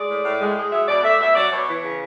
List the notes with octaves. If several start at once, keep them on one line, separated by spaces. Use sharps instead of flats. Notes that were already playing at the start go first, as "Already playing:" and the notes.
Already playing: G#3 D5
A2
A2
G#3
G#3
F#3 E5
B2 D5
A3 E5
B2 E5
F#3 D5
B2 C#5
E3
C#3